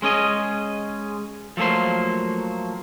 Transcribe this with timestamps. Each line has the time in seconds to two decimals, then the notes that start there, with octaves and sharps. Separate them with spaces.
0.02 G#3 C#4 G#4 D#5
1.57 F3 F#3 A3 A#3 C5